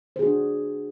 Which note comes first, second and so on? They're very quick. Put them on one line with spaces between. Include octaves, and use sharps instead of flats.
C5 G#4 F#4 D4